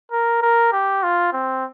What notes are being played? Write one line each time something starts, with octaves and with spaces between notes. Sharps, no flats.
A#4
A#4
G4
F4
C4